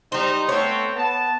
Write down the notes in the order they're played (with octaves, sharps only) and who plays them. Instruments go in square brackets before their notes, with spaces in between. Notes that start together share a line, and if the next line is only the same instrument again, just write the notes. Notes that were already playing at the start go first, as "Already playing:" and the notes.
[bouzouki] G3 C5 [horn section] D#4
[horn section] A3 B3 C4 [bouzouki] C#5
[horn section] B3 A5